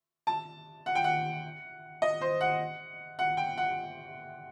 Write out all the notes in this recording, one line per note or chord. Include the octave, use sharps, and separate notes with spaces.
A5
F#5
G5
F#5
D#5
C5
F#5
F#5
G5
F#5